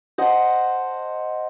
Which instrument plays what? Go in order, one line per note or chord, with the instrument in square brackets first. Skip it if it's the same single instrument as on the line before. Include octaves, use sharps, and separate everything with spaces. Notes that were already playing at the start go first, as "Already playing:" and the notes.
[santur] C5 D#5 F#5 A5